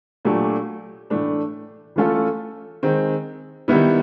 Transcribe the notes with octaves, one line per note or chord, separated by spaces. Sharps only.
A#2 F#3 A3 D4 G4
A2 E3 A3 D4
E3 A3 C#4 F4 A4
D#3 G#3 C4
D#3 G3 B3 E4